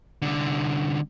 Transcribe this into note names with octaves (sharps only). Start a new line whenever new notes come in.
C2 D3